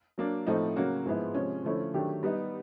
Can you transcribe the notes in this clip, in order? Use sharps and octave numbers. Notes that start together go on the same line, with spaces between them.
F#3 A#3 D4
A2 F3 A3 C4 D#4
C#3 F#3 A#3 C#4 F#4
G#2 F3 G#3 B3 E4
C3 F3 G#3 C#4
D3 F3 A3 C#4 E4
D#3 F#3 A3 D4 G4
G3 B3 D#4